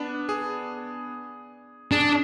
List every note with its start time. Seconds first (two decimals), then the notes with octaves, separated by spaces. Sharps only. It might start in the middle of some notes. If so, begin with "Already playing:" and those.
Already playing: B3 D4
0.29 G#4
1.92 D4 G#4